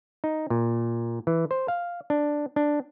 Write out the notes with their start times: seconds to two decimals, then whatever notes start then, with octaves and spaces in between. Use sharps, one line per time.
0.24 D#4
0.50 A#2
1.27 E3
1.51 C5
1.68 F5
2.10 D4
2.56 D4